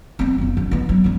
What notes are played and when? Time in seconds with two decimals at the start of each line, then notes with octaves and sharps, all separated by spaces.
0.19 B3 C4
0.38 F#1 F3
0.57 C#4
0.71 E3 B3
0.89 F#3
1.04 G#3 B3